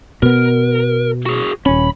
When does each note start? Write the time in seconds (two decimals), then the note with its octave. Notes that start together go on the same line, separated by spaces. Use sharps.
0.22 B2 B3 A#4
1.26 F#4 G#4
1.66 D#1 C#4 B5